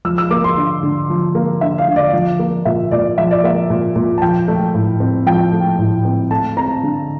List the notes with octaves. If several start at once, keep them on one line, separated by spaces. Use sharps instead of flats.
F3 E6
E6
A#3 D6
C6
D3
D3
F3
A#3
D3 E5
F5
D3
D5
F3
A#3
A#2 E5
A#2 D5
F3 E5
D5
A#3 E5
A#2
A#2
A5
F3 G5
A3
A2
C4
F3 G5
A3
A2
C4
A3 A5
C4 A#5
D3